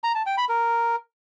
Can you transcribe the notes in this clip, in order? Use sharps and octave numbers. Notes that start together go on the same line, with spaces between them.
A#5
A5
G5
B5
A#4